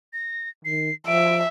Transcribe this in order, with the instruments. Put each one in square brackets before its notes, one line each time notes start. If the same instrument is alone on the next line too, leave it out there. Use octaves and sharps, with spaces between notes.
[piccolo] A#6
[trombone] D#3 [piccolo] C7
[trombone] F3 [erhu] E5 [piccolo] D7